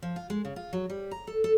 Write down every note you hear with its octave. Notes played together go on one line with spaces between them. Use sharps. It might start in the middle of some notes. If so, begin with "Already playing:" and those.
F3
F4
G#3
C#3
F4
F#3
G3
A#5
A4
A4